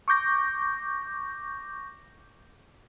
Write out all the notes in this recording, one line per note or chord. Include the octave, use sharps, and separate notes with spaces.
C#6 D6 G6 A#6